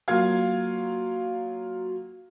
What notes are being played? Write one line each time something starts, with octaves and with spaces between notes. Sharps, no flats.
F#3 A#3 F4 F5 F6 G#6